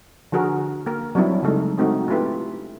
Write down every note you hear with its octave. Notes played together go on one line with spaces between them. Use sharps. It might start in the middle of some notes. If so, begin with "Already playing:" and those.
D3 F3 F#4 G#4 A#4
A#3 A#4
F#3 G3 C4 D4 E4
C#3 F#3 G#3 A3 D#4
G#3 A3 C4 D#4 F#4
A3 C#4 E4 F4 G4 B4